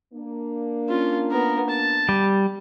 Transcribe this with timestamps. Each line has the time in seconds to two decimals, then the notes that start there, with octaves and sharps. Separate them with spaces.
0.13 A#3 D4
0.89 C#4 F4
1.31 B3 A#4
1.69 A5
2.09 G3